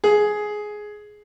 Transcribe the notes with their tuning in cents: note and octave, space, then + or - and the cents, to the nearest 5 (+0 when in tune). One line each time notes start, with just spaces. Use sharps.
G#4 +10